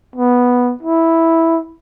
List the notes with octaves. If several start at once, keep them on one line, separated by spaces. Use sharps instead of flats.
B3
E4